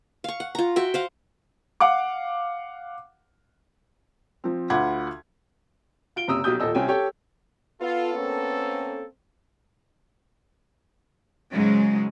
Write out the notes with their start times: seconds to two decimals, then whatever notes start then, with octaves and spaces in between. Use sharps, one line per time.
0.24 F5 C#6
0.40 F#5
0.55 F4 A#5
0.76 F#4 E5 G5
0.94 C5 F5 F#5
1.80 F5 F#5 D6
4.44 F3 C4
4.70 D2 F4 F#5 B5 D6 G#6
6.16 F4 D7 G7
6.28 F#1 C3 A#5 D#6 E6
6.44 B1 F#3 G4 D#6 G6
6.60 D#1 A#2 A4 D#5 E6
6.75 C2 C4 C#4 G5 G#5
6.88 G4 A4 C#5 G5
7.81 B3 F4 A4
8.14 A#3 C4 C#4
11.53 G#2 C#3 F#3 G#3